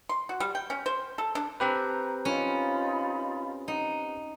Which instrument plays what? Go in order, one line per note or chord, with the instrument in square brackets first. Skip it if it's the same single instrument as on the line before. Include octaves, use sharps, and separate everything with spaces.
[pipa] C6
F#4
G3
G5
C#4
C5
A4
D4
[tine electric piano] C4 G4 B4 [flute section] A4 A#5 G6
[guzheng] C#4 [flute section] D#4 F4 B5
[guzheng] D#4 [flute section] F#5